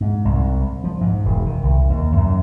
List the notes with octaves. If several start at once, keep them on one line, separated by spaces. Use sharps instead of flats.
G#2
C2
F3
G#2
E1
D#3
C2
D#2
F#2